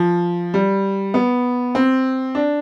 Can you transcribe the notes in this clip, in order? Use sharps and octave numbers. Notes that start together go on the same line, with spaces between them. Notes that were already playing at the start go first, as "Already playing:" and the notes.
Already playing: F3
G3
B3
C4
D4